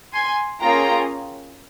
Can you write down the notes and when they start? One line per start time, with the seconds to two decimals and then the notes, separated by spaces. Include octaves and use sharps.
0.14 G#5 C6
0.61 A#3 C#4 F4 G#4 G5 A#5